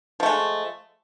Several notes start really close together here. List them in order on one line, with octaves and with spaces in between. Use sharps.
F3 A3 G#3